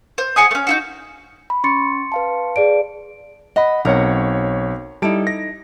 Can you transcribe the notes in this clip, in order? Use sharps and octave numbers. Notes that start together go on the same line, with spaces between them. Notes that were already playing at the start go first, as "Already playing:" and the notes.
C5
G#4 F#5 G#5 D#6
A3 C#4
D#4 E4 F#4
B5
C#4 C6 C#6 A6 C#7
B4 F5 A5
G#4 D5 D7
D#5 F#5 B5
B1 C4 A#4 C#5 F#5
G3 D#4 E4 A4 D7
A#6